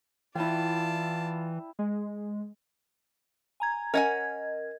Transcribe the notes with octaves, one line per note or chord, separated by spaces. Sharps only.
E3 E4 F4 D5 G5 A5
G#3
G#5 A#5 G#6
C#4 A#4 D#5 F#5 G#5 G#6